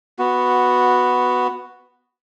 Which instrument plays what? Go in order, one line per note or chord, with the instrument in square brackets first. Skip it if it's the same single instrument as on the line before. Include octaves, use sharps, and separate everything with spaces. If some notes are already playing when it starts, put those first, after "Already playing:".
[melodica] B3 F#4